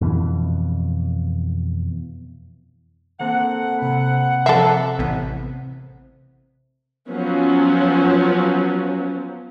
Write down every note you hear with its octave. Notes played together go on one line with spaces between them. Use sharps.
F2 B2 E3
A#3 C4 A4 F#5
C3 B5
F3 A4 E5 A#5 C7
A1 B3
F3 F#3 B3 C#4